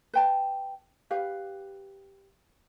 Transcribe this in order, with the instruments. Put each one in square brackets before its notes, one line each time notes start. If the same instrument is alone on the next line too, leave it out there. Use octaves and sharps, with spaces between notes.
[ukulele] B4 G5 A5
G4 B4 F5